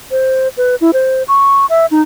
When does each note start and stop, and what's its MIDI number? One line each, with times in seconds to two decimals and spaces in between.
0.11 0.48 72
0.57 0.75 71
0.81 0.91 64
0.93 1.23 72
1.28 1.66 85
1.70 1.86 76
1.91 2.02 63